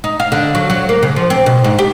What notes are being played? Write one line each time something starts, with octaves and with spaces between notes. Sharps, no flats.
D#4
F5
D3
F#3
F#3
A#3
C#3
F3
C4
B2
G#2
G4